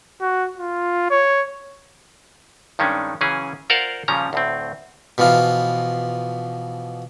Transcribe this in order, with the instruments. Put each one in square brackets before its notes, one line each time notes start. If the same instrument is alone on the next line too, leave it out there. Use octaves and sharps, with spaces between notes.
[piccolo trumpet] F#4
F4
C#5
[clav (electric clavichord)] G2 D#3 G#3 C#4 D4
C#3 E3 F#3 C#4 G#4
F4 A#4 C5 D5 F5 F#5
A#2 C#3 F3 G3 C#4 A#5
D2 A2 C4
[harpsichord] B2 E3 F3 F4